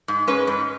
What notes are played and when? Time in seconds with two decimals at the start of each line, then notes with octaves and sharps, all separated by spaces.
0.08 G#2
0.27 G#3 C#4 B4
0.47 G#2